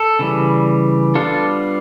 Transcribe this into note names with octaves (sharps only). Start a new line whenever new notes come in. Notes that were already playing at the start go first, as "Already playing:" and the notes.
Already playing: A4
C#3 E3 G3
G3 B3 D4 F4 A4